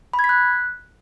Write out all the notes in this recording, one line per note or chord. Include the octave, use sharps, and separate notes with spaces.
B5
G#6
B6
F#6